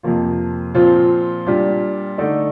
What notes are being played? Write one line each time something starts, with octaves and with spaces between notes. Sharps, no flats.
F2 C3 F3 A#3 F4
A#2 F3 C4 F4
A#2 G3 D4 F4
D3 A3 D#4 A4 D5